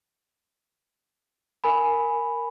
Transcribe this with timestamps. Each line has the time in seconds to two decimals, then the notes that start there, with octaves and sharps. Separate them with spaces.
1.64 A#4 G#5 B5